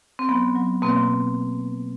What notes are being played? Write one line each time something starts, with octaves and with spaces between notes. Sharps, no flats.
C4
F#3 B3
F#3
B2 A#3 C4